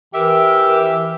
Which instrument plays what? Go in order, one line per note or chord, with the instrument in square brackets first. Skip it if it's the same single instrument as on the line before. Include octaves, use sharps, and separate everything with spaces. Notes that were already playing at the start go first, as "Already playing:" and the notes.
[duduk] E3 [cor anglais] G4 [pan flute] A#4 [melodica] E5